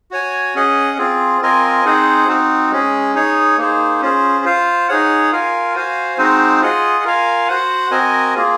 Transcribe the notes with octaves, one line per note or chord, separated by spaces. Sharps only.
F#4 C#5 G#5
C#4 G#4 D#5 F#5
C4 F4 G#4
C4 F4 A#4 D#5 G#5
C4 D#4 G#4 C5 F#5
C4 D#4 F#4
G#3 C#4 G#4
D#4 G#4 C#5
A#3 D#4 G#4 C5
C#4 F4 G#4 C5
F4 C5 F5
D#4 G#4 C#5 F#5
F4 A#4 F5 G#5
F#4 C5 F5 G#5
G#3 C4 D#4 F#4 C5
F4 G#4 D#5 F#5
F4 A#4 F5 G#5
F#4 C5 F#5
C4 F#4 A#4 D#5 G#5
A#3 F4 G#4